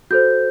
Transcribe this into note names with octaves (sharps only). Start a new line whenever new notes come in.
F#4 A4 C5 G6